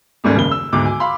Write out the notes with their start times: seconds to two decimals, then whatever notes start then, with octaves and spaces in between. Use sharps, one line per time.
0.24 D#2 G#2 G3 A3 C#4
0.36 F#1 D#2 C#3 G7
0.51 E6
0.72 D2 G#2 B2 D6
0.85 G#5
1.00 F5 B5 C6